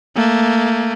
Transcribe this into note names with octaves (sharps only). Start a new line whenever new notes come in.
A3 A#3